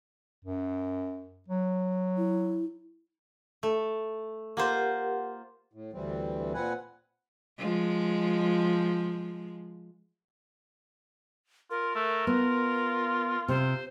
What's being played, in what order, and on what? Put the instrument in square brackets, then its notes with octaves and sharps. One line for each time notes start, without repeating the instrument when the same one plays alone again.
[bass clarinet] F#2
F#3
[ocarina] E4
[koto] A3
[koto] A#3 F4 C5 [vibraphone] G4 A#4 F#5
[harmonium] A2
D2 E3 G3 C4
A#2 C4 B4 F#5 G#5
[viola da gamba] F3 G#3
[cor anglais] F4 [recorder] A#4
[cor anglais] A3
[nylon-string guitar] B3 [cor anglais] F4
[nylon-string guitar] C3 [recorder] C5